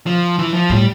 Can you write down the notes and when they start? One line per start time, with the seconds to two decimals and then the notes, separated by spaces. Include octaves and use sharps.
0.07 F3
0.39 E3
0.54 F3
0.70 A2 G3